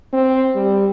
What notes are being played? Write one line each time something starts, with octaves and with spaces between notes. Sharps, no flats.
C4
G3